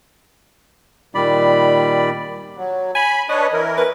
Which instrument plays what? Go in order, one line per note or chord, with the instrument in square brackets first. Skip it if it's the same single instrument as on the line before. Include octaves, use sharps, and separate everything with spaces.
[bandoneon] A#2 D#3 G3 D5 B5
[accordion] F#3
[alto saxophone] G#5 [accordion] B5
[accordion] D4 B4 C#5 [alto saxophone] D#5
[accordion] E3 E4 A#4
[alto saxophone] B4